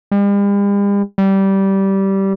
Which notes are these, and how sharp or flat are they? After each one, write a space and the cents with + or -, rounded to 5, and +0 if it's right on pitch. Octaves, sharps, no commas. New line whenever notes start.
G3 +45
G3 -15